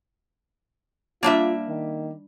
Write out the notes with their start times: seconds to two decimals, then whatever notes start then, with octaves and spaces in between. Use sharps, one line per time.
1.23 G3 A#3 D4 F4 E5 A5
1.68 D#3